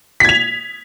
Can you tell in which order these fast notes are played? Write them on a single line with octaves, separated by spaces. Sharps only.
B6 G#6 F7